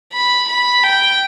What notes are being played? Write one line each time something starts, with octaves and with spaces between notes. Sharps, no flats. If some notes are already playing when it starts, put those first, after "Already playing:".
B5
B5
G5